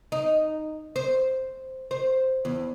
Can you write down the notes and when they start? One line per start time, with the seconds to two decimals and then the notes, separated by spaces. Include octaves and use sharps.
0.12 D#4
0.96 C5
1.91 C5
2.45 E2